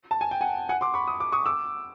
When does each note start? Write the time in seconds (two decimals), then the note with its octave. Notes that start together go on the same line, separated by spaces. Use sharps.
0.11 A5
0.21 G#5
0.31 G5
0.41 F#5 G#5
0.69 F#5 G#5
0.81 C6 D6
0.94 B5 C#6
1.08 D#6
1.20 D6
1.32 C#6 D#6
1.46 D6 E6